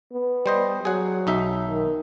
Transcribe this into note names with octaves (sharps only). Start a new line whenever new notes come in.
B3
G3 C5 D#5
F#3 G#4 F#5
B1 D#4 E5
D#3